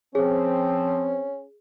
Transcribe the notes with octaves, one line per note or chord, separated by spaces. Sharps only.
F3 C4 C#4 G#4